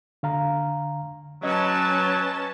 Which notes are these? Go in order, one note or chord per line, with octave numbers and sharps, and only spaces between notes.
D3 F5 A#5
F#3 C#4 B4 D#5 A5